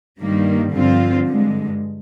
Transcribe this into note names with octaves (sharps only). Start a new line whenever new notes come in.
G2 D#3 G3 A#3
G2 D3 F3 C4 F4
G2 D3 G#3